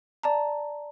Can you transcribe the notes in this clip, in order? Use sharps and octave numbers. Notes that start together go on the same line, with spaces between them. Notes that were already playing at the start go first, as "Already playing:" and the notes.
D5 A5 A#5